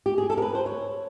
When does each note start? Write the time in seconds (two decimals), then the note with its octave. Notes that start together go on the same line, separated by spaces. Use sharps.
0.06 G4
0.18 G#4
0.30 A4
0.37 A#4
0.42 B4
0.55 C5
0.66 C#5